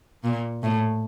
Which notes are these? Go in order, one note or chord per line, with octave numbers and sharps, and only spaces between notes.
A#2
A2